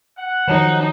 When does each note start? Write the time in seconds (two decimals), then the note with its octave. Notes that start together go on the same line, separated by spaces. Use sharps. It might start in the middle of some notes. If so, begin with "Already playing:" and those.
0.18 F#5
0.48 D#3 F3 F#3 D#4